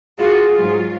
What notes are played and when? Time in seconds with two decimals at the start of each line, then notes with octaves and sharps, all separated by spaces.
0.19 F4 F#4 G#4
0.55 G#2 F#3 F4